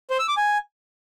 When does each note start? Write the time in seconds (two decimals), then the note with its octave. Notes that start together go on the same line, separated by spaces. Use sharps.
0.10 C5
0.19 E6
0.28 D6
0.37 G#5